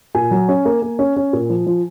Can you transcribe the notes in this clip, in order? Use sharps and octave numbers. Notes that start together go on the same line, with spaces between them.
A#2 G#5
F#3
C#4
A#3
A#3
C#4
C#4
A#2
F3
F3